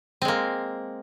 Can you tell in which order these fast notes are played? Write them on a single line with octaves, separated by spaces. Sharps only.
C4 G#3 A#3